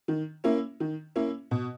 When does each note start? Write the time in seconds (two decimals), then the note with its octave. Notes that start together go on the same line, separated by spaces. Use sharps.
0.08 D#3
0.44 A#3 C#4 E4
0.80 D#3
1.16 A#3 C#4 E4
1.51 B2